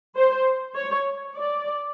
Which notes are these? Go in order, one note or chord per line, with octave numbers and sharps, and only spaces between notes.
C5
C#5
D5